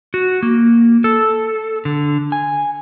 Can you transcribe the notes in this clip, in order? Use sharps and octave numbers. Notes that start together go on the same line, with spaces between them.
F#4
A#3
A4
D3
G#5